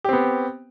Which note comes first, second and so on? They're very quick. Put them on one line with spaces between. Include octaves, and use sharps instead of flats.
G4 C4 B3